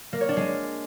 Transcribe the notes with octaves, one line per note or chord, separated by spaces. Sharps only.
A#3
C#5
D4
G#3